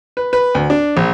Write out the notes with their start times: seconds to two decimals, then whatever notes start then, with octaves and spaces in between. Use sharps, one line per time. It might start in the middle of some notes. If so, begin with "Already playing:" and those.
0.17 B4
0.33 B4
0.55 D2
0.70 D4
0.97 A#1